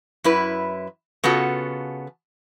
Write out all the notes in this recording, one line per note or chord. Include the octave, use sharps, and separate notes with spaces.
F#2 E4 B4
C#3 B3 F4 F#4 A4